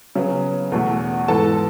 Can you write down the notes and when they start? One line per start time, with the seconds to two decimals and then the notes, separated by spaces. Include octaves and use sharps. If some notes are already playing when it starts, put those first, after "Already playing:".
0.16 C#3 F#3 B3
0.72 E2 B2 A3
1.28 G#2 E3 B3 A4 A5